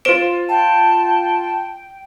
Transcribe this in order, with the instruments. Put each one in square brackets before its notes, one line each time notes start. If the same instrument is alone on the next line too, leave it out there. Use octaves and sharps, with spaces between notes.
[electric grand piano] F4 E7 [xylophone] C5 D7
[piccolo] G5 [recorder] A5